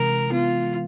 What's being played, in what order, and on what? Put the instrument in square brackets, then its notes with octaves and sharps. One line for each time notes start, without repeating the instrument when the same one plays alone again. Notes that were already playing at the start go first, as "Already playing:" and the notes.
Already playing: [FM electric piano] C3 E3 G#3 [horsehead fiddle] A#4
[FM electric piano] B3 [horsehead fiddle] F4